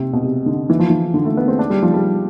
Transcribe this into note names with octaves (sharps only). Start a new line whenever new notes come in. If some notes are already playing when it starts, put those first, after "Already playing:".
Already playing: C3
B2
C3
D3
E3
F3
E3
D3
A3
B3
C4
D4
G3
F3
G3